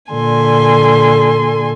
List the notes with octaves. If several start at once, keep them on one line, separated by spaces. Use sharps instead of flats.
A#2 D3 A4 G#5 C6